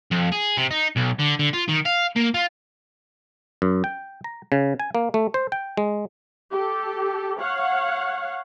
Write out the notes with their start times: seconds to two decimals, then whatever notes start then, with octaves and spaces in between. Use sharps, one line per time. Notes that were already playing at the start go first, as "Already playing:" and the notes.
0.12 F2
0.32 G#4
0.58 C3
0.71 D#4
0.96 B1
1.19 D3
1.39 D3
1.54 F4
1.69 D#3
1.86 F5
2.16 A#3
2.34 F4
3.62 F#2
3.84 G5
4.24 A#5
4.52 C#3
4.79 G#5
4.95 A#3
5.14 A3
5.34 C5
5.52 G5
5.77 G#3
6.52 G4 A4
7.39 C#5 F5 F#5